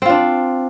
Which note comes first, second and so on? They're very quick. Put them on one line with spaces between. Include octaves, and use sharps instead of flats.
C4 F4 D4